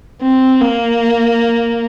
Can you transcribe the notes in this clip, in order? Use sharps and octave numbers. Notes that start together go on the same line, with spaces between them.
C4
A#3